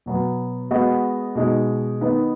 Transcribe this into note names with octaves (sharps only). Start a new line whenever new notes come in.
B2 F#3 B3
G#3 B3 F#4 D#5
B2 G#3 D#4
D#3 B3 D#4 B4 D#5